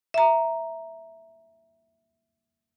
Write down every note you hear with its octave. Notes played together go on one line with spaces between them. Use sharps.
E5 A#5